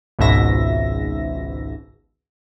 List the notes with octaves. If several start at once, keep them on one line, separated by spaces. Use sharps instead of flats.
G#1 C#2 G#2 B2 E5 A#6